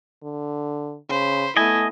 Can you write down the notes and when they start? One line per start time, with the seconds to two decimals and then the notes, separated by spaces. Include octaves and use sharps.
0.23 D3
1.09 C#3 C5 B5
1.57 A3 B3 E4 D#5 G#5